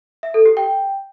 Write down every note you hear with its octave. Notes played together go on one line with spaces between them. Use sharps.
E5
A4
G4
G5